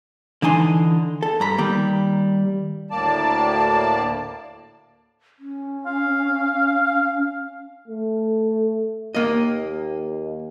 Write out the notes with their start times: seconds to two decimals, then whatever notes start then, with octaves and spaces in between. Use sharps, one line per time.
0.42 D3 E3 D#4 G#5 C6
1.23 A4
1.40 G2 A#5 B5
1.58 D#3 G3 A#3
2.91 D2 A2 A#3 D5 A5
5.39 C#4
5.87 F5
7.88 A3
9.15 D#2 A#3 D#5